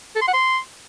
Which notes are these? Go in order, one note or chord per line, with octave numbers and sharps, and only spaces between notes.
A4
C6
F#5
C6